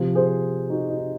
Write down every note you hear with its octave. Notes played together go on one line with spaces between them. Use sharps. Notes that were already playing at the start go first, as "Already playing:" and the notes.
Already playing: C3 F3
G#4 C5
D#4 F#4
D#4 F#4